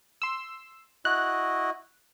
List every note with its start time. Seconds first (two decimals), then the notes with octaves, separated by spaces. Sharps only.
0.22 C6 E6
1.05 E4 F#4 D#5 F#6